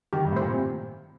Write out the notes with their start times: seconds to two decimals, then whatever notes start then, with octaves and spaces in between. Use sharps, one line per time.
0.13 D#3 G4
0.25 G2
0.32 A2
0.36 A#2 C5
0.49 C3